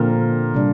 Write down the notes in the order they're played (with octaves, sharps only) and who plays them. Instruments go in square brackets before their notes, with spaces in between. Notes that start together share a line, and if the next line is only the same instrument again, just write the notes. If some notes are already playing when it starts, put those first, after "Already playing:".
Already playing: [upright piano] A#2 [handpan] D3 F3 C4 A#4
[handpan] C3 G3 D4